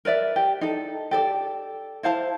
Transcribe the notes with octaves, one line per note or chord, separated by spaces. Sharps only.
A#4 B4 D5 E5
G4
D#4 A4
G4 A4 D5
E4 C5 F5 A5